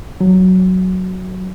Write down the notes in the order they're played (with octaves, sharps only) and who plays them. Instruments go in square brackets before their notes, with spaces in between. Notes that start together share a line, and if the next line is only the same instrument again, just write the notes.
[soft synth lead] F#3